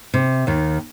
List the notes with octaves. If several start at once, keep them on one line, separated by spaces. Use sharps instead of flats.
C3
D#2 D#3